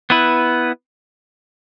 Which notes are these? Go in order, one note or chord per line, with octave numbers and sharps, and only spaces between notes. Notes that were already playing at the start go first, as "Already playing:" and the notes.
B3 E4 B4